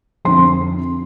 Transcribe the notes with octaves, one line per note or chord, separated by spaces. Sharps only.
F2 D3 F3 C6